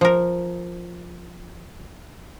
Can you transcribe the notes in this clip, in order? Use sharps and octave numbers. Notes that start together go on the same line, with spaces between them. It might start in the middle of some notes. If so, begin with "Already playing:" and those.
F3 A#4